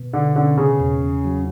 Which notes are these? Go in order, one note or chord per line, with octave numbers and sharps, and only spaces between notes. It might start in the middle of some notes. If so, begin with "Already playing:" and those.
Already playing: B2
D3
D3 C#4
C#3
E2
F#3